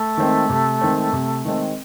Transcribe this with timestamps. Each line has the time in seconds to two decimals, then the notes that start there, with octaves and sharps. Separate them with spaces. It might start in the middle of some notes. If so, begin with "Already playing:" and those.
Already playing: A3
0.17 D#3 G#3 C4
0.50 C3
0.81 D#3 G#3 C4
1.13 C3
1.45 D#3 G#3 C4